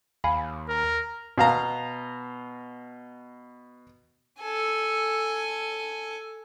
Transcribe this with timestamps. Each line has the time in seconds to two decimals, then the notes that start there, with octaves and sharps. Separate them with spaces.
0.24 D#2 F5 G#5 B5
0.69 A#4
1.38 B2 F5 A#5
4.41 A4 G#5